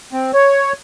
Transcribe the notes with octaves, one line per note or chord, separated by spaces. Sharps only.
C4
C#5